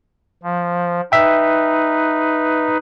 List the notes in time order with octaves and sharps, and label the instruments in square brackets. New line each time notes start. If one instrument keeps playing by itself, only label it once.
[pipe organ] F3
[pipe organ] D#4 B4 [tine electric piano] E5 G5